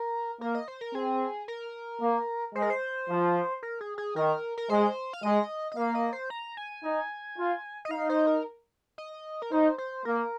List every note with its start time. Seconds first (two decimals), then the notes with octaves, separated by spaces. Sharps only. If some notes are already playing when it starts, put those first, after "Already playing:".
Already playing: A#4
0.41 A#3 A#4
0.55 D#5
0.68 C5
0.81 A#4
0.94 C4 G#4
1.48 A#4
2.01 A#3
2.55 G#3 C5
2.62 A#4
2.70 C5
3.09 F3
3.63 A#4
3.81 G#4
3.98 G#4
4.16 D#3 A#4
4.58 A#4
4.70 G#3 C5
5.13 F5
5.23 G#3 D#5
5.72 D#5
5.77 A#3 F5
5.95 D#5
6.13 C5
6.30 A#5
6.57 G#5
6.84 D#4
7.38 F4
7.85 D#5
7.91 D#4 F5
8.09 C5
8.27 A#4
8.98 D#5
9.42 A#4
9.52 D#4 C5
9.78 C5
10.05 A#3 A#4